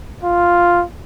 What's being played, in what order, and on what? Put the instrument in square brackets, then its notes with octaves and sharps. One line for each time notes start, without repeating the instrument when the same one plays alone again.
[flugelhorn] F4